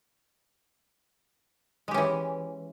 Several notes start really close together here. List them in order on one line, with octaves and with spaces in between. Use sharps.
G#3 G4 C#4 E3